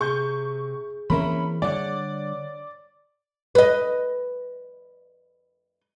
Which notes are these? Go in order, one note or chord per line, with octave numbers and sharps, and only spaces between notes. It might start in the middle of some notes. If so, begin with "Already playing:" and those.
C3 G#4 C#6 G6
E3 A#3 C4 C#4 A#4 E5 B5
D3 G3 C#5 D5 F#5
B4 D#5